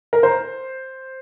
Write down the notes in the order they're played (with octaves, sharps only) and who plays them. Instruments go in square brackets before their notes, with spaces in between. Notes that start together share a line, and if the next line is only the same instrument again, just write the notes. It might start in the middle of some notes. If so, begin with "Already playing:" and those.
[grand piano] A#4
C5